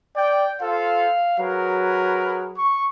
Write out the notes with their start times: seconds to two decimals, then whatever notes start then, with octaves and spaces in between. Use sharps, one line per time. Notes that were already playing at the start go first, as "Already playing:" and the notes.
0.16 D5 G5
0.61 F4 A4 C5 F5
1.39 F#3 G#4 A#4 B4
2.57 C#6